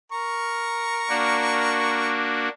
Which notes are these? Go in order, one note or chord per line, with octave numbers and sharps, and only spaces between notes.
A#4 A#5 C#6
A#3 D4 F#4